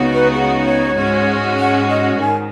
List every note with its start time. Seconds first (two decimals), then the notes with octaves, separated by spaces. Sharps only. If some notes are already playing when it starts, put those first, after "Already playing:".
Already playing: C#2 C#3 B3 D#4 F#4
0.13 B4
0.34 G#4
0.65 C#5
0.96 G#2 G#3 C#4 F#4
1.59 F#5
1.90 D#5
2.21 G#2 D#3 G#5